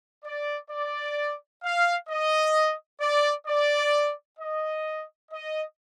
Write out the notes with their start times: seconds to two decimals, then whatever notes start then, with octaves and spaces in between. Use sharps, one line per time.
0.25 D5
0.70 D5
1.63 F5
2.09 D#5
3.01 D5
3.47 D5
4.39 D#5
5.32 D#5